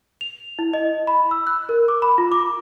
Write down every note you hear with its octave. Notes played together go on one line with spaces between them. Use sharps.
F7
E4
D#5
B5
E6
F#6
A#4
D6
B5
F4
D6